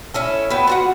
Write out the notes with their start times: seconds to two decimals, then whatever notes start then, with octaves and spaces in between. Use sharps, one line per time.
0.14 C#4 E4 A4
0.50 B3 G4 A4 B4
0.67 F4 F#4 F#5